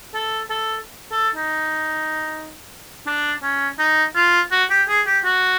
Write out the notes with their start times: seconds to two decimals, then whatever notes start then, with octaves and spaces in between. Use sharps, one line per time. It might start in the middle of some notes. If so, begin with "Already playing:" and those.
0.14 A4
0.50 A4
1.12 A4
1.35 D#4
3.07 D4
3.43 C#4
3.79 D#4
4.16 F4
4.52 F#4
4.70 G4
4.89 G#4
5.07 G4
5.25 F#4